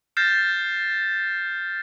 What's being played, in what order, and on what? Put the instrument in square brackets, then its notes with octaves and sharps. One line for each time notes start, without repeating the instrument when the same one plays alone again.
[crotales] F6 G6 A6 A#6 C7 E7